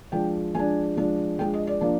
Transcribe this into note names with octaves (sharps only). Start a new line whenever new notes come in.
F3 G#3 D4 G5
F3 G#3 D4 G#5
F3 G#3 D4
F3 G#3 D4 G5
D#5
D5
F3 A#3 D4